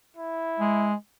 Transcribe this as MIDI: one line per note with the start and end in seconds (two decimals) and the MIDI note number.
0.16 0.90 64
0.59 0.94 56